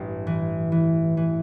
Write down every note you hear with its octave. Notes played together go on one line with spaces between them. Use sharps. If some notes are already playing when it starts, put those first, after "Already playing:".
Already playing: A1 G2
E3
E3
E3